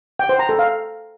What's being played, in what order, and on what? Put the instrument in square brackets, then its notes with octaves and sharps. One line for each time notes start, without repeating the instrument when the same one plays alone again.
[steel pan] G5
C5
A#5
A4
F5